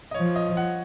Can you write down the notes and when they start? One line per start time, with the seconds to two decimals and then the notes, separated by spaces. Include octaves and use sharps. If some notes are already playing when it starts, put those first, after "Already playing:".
0.11 D#5
0.14 F3 C#5
0.36 D#5
0.57 F#5